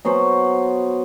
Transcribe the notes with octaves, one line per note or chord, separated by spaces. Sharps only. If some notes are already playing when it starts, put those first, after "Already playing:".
F#3 B3 F#4 C5